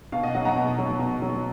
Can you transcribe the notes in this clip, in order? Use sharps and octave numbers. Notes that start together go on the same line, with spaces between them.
B2 F5
D#5 F#5
F#3 D#5 F#5
F#5 A#5
B2
F#3
B2
F#3